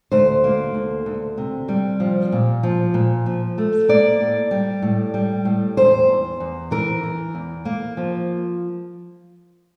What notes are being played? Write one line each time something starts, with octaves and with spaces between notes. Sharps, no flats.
D2 C5
A#3
D2
D2
C3
G3
F3
A#2
F3
A#2
F3
A3
A#3 D5
A2
G3
A2
G3
A2
E2 C5
E2
E2
E3 A#4
E3
E2
A#3
F3